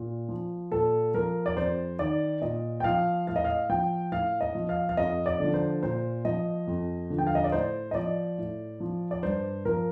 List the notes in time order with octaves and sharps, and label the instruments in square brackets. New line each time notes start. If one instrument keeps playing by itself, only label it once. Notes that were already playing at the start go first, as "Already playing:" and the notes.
Already playing: [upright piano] A#2
F3
A#2 A4
F3 A#4
D5
F2 C5
D#3 D5
A#2 D#5
G5
F3 F5
A2 F5
D#5
F5
F3 G5
A2 F5
D#5
F3
F5
F5
F2 D#5
D5
D3 F3
C5
A#2 C5
F3 D#5
F2
D3 F3
G5
F5
D#5
D5
A2 C5
D#5
F3 D5
A2
F3
D5
G2 C5
F3 A#4